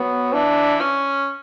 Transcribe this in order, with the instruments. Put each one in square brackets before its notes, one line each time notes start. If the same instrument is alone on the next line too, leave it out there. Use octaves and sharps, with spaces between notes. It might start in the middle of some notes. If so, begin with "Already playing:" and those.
Already playing: [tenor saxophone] F#3 [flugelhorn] B3
[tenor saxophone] E3 [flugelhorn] D4
[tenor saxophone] C#4